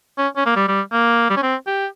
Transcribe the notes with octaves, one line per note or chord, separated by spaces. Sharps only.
C#4
C#4
A#3
G3
G3
A#3
G3
C#4
C4
G4